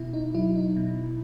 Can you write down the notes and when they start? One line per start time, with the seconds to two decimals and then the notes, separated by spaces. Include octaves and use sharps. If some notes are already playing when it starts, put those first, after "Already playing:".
Already playing: B2 E4
0.13 D#4
0.35 F#3 E4
0.56 D#4
0.76 B2